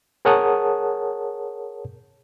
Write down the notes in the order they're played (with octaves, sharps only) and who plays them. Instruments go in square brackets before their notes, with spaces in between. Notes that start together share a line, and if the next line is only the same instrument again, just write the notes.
[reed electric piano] G#4 A#4 C#5 F#5 A5 D#6